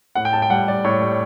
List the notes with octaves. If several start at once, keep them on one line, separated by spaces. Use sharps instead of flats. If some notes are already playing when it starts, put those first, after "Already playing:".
A2 F#5
G5
A2 A5
G5
G3 F#5
G3 D5
A2 C#5
G3